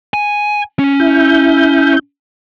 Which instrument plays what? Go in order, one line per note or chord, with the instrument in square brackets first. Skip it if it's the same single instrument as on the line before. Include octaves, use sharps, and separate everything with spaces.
[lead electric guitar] G#5
C#4
[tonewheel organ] E4 G6